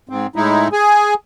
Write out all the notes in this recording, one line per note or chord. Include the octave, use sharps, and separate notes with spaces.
G#2 C4
A2 G#3 D#4 E4
G#4 G#5